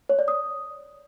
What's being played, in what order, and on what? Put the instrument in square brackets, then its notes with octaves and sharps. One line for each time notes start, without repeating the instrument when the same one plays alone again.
[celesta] C#5
D5
D#6